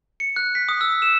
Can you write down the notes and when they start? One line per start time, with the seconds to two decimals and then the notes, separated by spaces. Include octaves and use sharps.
0.20 C#7
0.36 F#6
0.55 B6
0.69 D#6
0.81 E6
1.02 E7